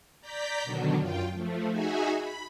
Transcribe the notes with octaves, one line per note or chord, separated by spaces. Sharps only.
D5 A#5 G6 B6
B2 D3 D#3 F#3 D4
F#2 F4 G5
F3 A3
D#4 F#4 G#4 E5 G#5
B5